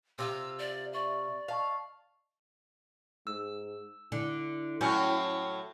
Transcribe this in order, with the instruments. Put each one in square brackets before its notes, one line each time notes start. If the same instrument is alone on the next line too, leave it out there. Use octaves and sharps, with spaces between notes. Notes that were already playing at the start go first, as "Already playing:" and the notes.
[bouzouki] C3 F4 [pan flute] E6
[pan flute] D5
[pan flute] D5 [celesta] E5 C#6
[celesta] D#5 A5 C#6 [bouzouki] F5
[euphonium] G#2 [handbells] E6
[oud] D3 [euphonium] E4
[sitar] A2 F#3 F#4 [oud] C#4 [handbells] C#6 F6 G6